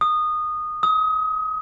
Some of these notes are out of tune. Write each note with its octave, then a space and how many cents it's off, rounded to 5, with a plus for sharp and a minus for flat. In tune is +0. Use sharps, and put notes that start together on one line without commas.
D#6 -20
D#6 +30